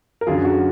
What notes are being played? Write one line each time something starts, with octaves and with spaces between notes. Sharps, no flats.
A#4
F#2 D3 F#3 F4 G#4
F#4